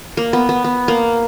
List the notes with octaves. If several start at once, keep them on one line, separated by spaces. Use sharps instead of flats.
A#3
B3
B3
B3
A#3